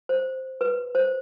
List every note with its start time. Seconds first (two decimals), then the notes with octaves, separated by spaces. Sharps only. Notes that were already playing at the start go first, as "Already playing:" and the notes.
0.09 C5
0.61 B4
0.95 C5